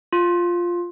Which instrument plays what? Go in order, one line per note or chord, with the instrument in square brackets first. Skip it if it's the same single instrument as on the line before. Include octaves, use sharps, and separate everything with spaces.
[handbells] F4